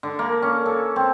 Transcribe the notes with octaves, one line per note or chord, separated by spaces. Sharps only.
D3
A#3
C#4
A4
C4